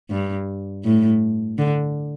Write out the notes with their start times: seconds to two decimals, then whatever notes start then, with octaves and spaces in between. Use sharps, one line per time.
0.11 G2
0.84 A2
1.58 D3